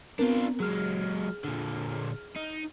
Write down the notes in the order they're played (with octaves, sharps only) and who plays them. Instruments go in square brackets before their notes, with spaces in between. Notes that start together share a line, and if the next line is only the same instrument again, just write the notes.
[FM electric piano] B3 C4 A#4 [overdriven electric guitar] D4 F4
[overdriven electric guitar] F#3 G#3 [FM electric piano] G#4 F6
[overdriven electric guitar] A#2 D3
D#4